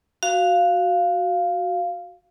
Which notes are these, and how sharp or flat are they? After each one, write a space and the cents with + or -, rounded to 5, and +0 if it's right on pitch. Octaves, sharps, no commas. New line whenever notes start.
F#4 +0 F5 +0